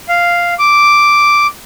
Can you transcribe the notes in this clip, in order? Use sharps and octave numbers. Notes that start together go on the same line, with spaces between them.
F5
D6